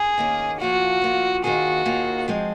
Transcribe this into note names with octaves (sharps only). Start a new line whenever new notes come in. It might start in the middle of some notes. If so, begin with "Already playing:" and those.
Already playing: G#4
D#3 A#3 C#4
F3 A#3 F4 F#4
F3 A#3 F4
D#2 D#3 A#3 F4 F#4 G#4
D#2 D#3 A#3 F4 G#4
F3 G#3 C4